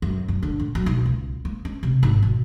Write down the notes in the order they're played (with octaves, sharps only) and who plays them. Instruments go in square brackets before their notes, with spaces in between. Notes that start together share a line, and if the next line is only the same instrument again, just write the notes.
[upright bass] F#2
F#2
D3
A2
F#3
B1
C#2
A#3
C#4
C3
G#1
B2